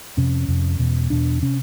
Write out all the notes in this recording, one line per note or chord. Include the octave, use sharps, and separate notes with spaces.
F2 C3 C#4
F2 C3
E2 B2
E2 B2 D4
C3 C#4